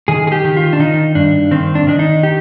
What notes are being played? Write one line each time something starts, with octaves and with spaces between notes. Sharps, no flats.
D#3 G#4
G#4
G4
D#3
F4
D4
D#3 D#4
G2 D4
D#3 C4
D4
D#3 D4
D#4
G4